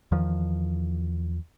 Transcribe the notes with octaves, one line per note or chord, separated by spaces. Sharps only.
E2 D#3 F3